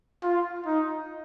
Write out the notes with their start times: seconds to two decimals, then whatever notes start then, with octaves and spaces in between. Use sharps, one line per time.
0.23 F4
0.66 D#4